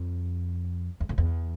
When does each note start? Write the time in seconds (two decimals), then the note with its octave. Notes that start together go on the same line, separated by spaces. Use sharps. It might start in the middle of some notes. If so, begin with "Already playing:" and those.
Already playing: F2
1.00 E2
1.09 F2
1.18 E2